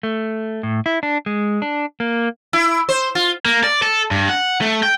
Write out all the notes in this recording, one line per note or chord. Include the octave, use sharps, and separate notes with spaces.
A3
A2
E4
D4
G#3
D4
A#3
E4
C5
F4
A#3
D5
A4
G2
F#5
A3
G5